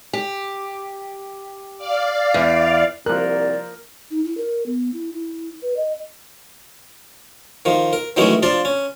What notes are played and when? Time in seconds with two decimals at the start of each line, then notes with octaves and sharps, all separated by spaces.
0.13 G4
1.77 D5 F5
2.34 E2
3.06 C2 F3 A#4 D5 F#6
4.11 D#4
4.25 E4
4.37 A#4
4.66 B3
4.94 E4
5.13 E4
5.62 B4
5.77 D#5
7.65 D#3 F3
7.93 A#4
8.17 D#3 E3 F#3 G#3 A3 C#4
8.43 F3 D4 F4 D5
8.65 C#4